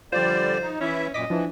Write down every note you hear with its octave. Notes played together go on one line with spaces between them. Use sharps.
D3 F3 G3 F4 C5 D5
D#4
E3 C#4 E4 E5
F#2 A#2 D#5 D6 B6
E3 F3 D4 E4